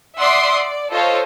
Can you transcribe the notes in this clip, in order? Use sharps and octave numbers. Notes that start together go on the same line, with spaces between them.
D5 E5 F#5 C6 D6 D#6
D5
F4 A4 C5 C#5 D#5